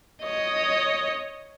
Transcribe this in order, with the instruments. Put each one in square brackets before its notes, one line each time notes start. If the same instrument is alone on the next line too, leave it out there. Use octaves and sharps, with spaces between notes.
[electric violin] C#5 D#5